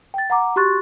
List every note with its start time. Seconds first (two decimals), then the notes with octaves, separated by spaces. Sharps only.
0.14 G5 A6
0.30 F#5 A#5 D6
0.56 F#4 G4 C6 C#6 F#6 A6